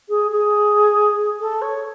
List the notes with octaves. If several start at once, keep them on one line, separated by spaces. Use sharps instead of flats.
G#4
G#4
A4
C#5